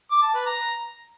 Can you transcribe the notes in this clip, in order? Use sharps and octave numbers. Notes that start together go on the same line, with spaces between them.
D6
A5
B4
A#5